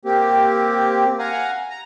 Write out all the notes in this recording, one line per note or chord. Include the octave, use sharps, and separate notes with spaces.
A#3 C4 G4
F5 F#5 G#5 A#5
A#5